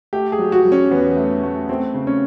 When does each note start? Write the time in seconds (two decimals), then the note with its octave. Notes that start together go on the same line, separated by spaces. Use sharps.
0.13 A3 G4
0.32 G#4
0.39 F#3
0.52 F#4
0.65 F#3
0.72 C#4
0.91 E2 B3
1.17 A3
1.43 A3
1.69 A3 C4
1.94 C#3
2.07 C#4